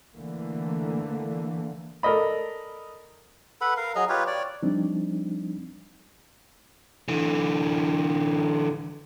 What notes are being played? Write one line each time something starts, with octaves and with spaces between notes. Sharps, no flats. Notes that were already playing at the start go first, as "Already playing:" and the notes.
D3 E3 A3 A#3
A4 A#4 D5 D#5 B5
A4 B4 F#5 B5
A#4 F5
F#3 G#4 D#5 A#5
F4 G4 B4 C#5
C#5 D5
F3 G3 C4 D4 D#4
D3 E3